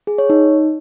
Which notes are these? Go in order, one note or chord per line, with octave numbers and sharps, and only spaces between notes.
G#4
C#5
D#4